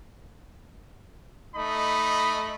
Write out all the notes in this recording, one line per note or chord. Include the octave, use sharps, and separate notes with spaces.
A3 D#4 D#5 B5